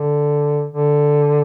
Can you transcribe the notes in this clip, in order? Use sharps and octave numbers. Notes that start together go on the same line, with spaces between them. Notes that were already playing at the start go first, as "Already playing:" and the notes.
Already playing: D3
D3